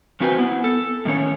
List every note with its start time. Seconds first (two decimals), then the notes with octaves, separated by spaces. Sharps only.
0.20 E2 C4 F#4 B4 C5 G#5
0.38 B3 E4
0.64 A4
1.05 A2 D#3 C#4 C#5